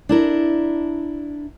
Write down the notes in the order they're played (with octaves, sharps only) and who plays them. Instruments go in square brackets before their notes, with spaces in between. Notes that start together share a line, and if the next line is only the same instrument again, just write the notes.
[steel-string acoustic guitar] D4 E4 A#4